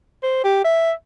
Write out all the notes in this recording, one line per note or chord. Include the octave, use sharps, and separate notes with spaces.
C5
G4
E5